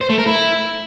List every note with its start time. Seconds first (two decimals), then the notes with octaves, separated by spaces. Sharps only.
0.01 C5
0.10 A3
0.18 A#4
0.27 E4